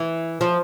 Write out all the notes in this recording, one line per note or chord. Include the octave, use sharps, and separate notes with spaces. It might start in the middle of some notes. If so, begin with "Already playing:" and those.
Already playing: E3
F3